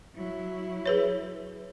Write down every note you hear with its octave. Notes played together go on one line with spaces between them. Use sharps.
F#3 E4
G#4 B4 C#5